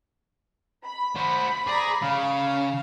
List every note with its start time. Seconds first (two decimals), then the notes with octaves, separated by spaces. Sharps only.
0.85 B5
1.16 F#4 C5
1.67 G#4 D5 A#5
2.02 C#3 F5